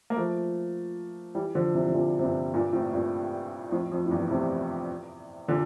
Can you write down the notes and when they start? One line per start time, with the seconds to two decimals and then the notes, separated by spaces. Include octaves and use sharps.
0.10 A#3
0.17 F3 A3
1.35 E3 G3
1.55 D3 F3
1.75 C3 E3
1.88 C3
1.94 A#2 D3
2.19 C3
2.24 G2 A#2
2.53 G2 A#2
2.73 A2 C3
2.93 G2 A#2
3.72 F2 A2
3.92 F2
4.06 A2
4.11 E2 G2
4.30 A2 C3
5.48 A#2 D3